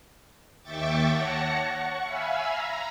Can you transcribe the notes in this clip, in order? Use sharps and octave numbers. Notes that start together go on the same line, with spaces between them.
D#2 E5 G5 C#6 D6 A6
C#5 F#5 A5 A#6 C#7
F#5 C#6
E5 F5 G#5 B5 E6
A#5